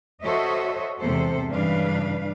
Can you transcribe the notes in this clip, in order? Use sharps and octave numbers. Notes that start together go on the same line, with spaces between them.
F#4 A4 C5 C#5 D#5 E5
E2 G#2 C3 G#3 A4 C5
G2 C#3 E3 D4 B4 F5